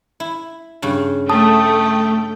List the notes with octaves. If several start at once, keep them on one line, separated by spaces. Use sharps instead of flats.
E4
G2 C#3
A3 G5 A5 D#6